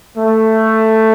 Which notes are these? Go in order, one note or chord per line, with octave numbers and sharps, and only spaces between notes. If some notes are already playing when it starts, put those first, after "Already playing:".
A3